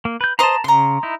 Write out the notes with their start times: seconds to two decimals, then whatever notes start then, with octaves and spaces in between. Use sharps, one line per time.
0.05 A#3
0.21 B4 G6
0.39 C5 D#5 A5 A#5 C6
0.64 C#3 A#5 C6
1.03 D#4 E4